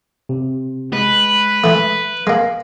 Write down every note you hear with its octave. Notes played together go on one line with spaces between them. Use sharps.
C3
G#3 B4
E3 A3
G#3 A#3